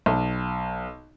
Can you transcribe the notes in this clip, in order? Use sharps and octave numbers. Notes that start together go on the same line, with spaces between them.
B1